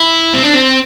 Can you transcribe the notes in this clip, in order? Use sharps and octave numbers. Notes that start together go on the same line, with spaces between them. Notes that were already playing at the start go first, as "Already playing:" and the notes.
Already playing: E4
C4
D4
C4